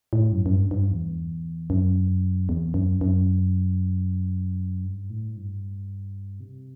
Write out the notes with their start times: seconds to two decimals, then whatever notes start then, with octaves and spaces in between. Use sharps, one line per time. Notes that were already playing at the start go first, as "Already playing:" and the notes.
0.13 A2
0.32 F#2
0.46 F#2
0.53 G2
0.71 G2
0.91 E2
1.70 F#2
2.49 E2
2.74 F#2
3.01 F#2
4.84 G2
5.10 A2
5.37 G2
6.40 C3